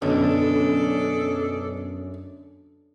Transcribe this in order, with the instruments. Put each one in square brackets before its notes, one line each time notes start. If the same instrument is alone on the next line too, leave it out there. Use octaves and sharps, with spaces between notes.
[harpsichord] B1 [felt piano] F#2 [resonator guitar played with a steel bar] D3 [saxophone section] D4 G#4 A4